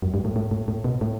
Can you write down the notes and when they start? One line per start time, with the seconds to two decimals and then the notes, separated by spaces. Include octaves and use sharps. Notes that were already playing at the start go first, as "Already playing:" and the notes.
0.02 F#2
0.14 G2
0.25 A2
0.36 A2
0.51 A2
0.68 A2
0.84 B2
1.01 A2